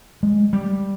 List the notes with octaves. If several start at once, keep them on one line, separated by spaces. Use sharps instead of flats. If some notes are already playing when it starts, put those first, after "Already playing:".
G#3
G3